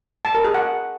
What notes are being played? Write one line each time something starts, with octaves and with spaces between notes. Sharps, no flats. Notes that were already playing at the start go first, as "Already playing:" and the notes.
A5
A#4
G#4
F#5